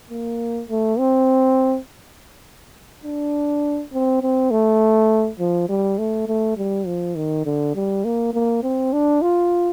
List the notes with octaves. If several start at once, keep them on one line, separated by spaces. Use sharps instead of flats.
A#3
A3
C4
D4
C4
C4
A3
F3
G3
A3
A3
G3
F3
D#3
D3
G3
A#3
A#3
C4
D4
F4